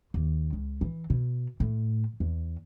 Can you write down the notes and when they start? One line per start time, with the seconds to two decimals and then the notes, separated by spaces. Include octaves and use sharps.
0.14 D#2
0.53 C#2
0.81 E3
1.10 B2
1.60 A2
2.20 E2